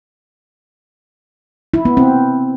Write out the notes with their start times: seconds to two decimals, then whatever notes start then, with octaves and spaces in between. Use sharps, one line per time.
1.74 E4
1.85 B3
1.97 C4